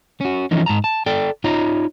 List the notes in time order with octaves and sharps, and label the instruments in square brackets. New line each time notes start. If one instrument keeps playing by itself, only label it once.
[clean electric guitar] C#4 F#4
E3 F3 C#4 D#4
G#2 A5 A#5
A5
A4 D5 G5
D#4 F4 C#5 D#5 A#5